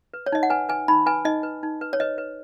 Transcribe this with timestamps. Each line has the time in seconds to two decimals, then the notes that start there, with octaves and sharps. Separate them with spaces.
0.14 B4
0.26 C#5
0.32 D#4 D#5
0.43 F#5
0.50 B4 G#5
0.69 B4 G#5
0.88 D#4 B5
1.06 B4 G#5
1.25 D#4 D#5
1.43 B4
1.63 D#4
1.81 B4
1.93 C#5
2.00 B4 D#5
2.18 B4